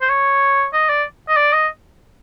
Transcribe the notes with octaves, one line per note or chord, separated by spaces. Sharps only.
C5
C#5
D#5
D5
D#5
D5
D#5